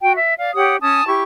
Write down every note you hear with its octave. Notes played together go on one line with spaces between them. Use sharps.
F#4 G5
E5
D5 F5
G4 C#5 F#5 D#6
C#4 G#5 A5 D#6
E4 G4 C#6